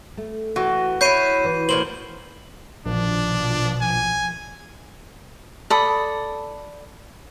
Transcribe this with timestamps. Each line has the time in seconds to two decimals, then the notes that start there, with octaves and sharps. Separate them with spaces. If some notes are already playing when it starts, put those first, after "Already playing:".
0.17 A3
0.56 E3 F#4
1.01 E4 B4 C#5 G6 C7 D#7
1.44 E3
1.69 A2 A#3 C5 F#7
2.86 A#1 B2 D#3 F3 D4
3.81 G#5
5.70 A4 D5 B5 D#6